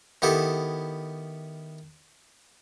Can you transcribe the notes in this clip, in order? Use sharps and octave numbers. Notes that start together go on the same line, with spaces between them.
D#3 B3 E4 G4 A4